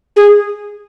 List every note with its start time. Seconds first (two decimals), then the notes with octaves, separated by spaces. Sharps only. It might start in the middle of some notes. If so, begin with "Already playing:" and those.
0.16 G#4